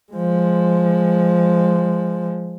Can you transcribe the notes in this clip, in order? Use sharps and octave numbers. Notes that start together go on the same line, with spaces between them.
F3 G#3